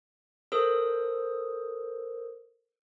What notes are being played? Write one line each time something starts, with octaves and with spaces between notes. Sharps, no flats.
A4 A#4 C5 D#6 E6